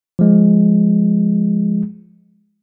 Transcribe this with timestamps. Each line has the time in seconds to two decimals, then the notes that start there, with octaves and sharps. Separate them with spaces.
0.19 F3 G#3